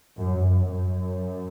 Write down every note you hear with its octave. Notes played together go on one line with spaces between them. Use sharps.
F#2
F#2
F#2